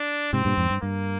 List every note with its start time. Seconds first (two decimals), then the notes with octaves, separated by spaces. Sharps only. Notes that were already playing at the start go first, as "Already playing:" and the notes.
Already playing: D4
0.33 G#2 C3 C4
0.45 G2 A#2
0.57 F2 G#2
0.70 G2
0.83 G2 A#3